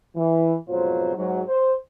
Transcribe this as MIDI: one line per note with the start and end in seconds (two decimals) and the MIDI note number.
0.16 0.56 52
0.69 1.15 41
0.69 1.15 44
0.69 1.15 47
0.69 1.15 54
0.69 1.15 65
0.69 1.15 72
1.16 1.42 44
1.16 1.42 54
1.47 1.73 72